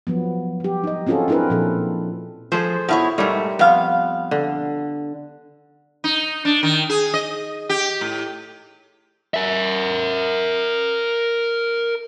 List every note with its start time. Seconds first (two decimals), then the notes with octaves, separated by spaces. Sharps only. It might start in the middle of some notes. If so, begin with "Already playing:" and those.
0.07 F3 F#3 B3
0.60 G3 G4
0.84 D#4 D#5
1.07 C4 C#4 F4 F#4 G#4 A4
1.28 C4 D4 E4 G#4 A#4 B4
1.50 A#2 F3 C4 A4
2.52 F3 G#4 A4 C5
2.89 B2 E4 C#5
3.18 G#2 G3 A3 A#4 C#5
3.59 F2 B3 F5
4.31 D3
6.04 D#4
6.45 D4
6.63 D#3
6.89 G#4
7.14 D#5
7.69 G4
8.01 A2
9.34 A#4 E5